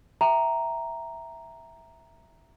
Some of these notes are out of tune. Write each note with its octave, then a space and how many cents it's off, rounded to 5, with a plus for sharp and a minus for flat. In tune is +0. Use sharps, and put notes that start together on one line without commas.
E5 +0 G5 +0 A#5 +0